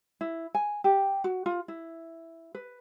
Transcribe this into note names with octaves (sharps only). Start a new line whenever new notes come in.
E4
G#5
G4
F#4
F4
E4
B4